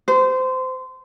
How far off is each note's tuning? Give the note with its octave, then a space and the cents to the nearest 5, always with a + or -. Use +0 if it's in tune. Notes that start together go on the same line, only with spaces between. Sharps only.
C5 -25